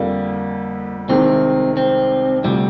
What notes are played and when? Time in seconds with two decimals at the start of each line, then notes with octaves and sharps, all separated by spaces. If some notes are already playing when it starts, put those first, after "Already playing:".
Already playing: F2 D3 G3 A#3
1.09 C2 C3 D#3 G#3 C4
1.77 C4
2.44 D2 C3 F3 G3